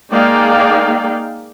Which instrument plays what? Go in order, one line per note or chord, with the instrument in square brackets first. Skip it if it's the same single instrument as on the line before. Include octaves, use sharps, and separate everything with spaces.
[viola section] G#3 A#3 D#4 D5 F5 G5